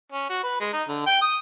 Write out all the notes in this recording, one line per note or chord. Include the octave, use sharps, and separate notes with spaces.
C#4
F#4
B4
G#3
D#4
D3
G5
D#6